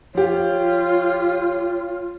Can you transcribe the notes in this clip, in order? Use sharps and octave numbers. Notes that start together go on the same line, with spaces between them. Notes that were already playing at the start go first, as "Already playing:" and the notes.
F3 F4 G4 C#5